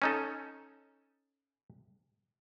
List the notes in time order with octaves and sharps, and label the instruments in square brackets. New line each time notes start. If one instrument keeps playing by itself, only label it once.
[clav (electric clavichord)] C#4 D#4 A4